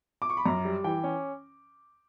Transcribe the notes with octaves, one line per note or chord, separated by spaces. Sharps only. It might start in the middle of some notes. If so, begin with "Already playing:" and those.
D6
C#6
B5
F#2 A#5
G3
E3 G5
C#4